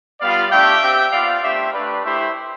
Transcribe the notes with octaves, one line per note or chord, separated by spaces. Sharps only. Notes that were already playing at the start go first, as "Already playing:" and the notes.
G3 B3 F4 D5 F5
A3 D4 G4 E5 G5
C4 G4
B3 F4 D5 F5
A3 D4 G4 C5 E5
A3 D4 G4 B4 D5
A3 E4 G4 C5 E5